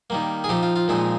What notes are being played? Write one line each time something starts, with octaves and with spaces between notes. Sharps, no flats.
D#3 G3 A#3
G#4
F3 C4 D#4 G4
F4
F4
A#2 F3 G#3 C4 D#4